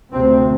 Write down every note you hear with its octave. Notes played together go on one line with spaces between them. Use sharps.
D2 C3 C4